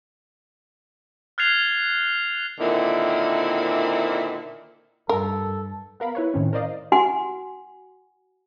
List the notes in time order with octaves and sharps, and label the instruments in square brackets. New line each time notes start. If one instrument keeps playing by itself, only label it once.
[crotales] F6 F#6 G#6 A6 C7 F7
[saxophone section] A#2 D3 D#3 C4 E4
[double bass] G2 [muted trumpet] A4 [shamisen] A#4
[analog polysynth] B3 A#4 F5 B5
E4 B4 C#5
A2 D#3 C4 C#4
A#4 C5 D5 D#5 F5
[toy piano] F#4 F#5 G#5 C6